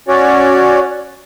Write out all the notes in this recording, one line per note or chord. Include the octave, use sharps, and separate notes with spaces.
C#4 F#4 C#5 D5